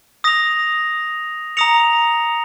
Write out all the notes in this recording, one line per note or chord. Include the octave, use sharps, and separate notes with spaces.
D#6 A#6 F7
A#5 D#6 A#6 C#7 F7